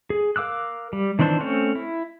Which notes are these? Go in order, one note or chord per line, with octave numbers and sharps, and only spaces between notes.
G#4
A#4 F5 D6 E6 F#6
G3
D#3 E3 C4 D4 C5
A3 C4 C#4 C#5
E4